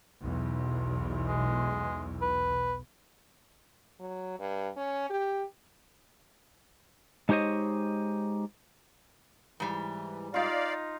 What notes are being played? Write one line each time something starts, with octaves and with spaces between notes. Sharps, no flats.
B1 E2
G#3
B4
F#3
G2
C#4
G4
G#3 D#4 G4 C5 C#5 D#5
G#2 E3 G3
D#4 F4 D5 F5